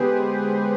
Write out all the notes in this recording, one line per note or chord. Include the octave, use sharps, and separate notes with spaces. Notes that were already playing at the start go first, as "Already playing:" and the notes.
Already playing: D3 G#3 B3 G4 G#4 B4 C5